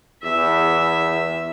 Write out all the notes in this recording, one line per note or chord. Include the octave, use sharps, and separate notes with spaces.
E2 E5